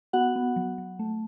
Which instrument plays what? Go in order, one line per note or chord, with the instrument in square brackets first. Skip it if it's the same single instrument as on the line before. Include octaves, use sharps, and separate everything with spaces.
[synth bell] B3 F#4 F#5
B3
F#3
F#3
A3